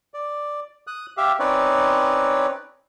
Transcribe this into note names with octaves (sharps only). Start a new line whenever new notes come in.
D5
D#6 F#6
G4 E5 F5
C4 C#4 D#4 B4 C#5 D5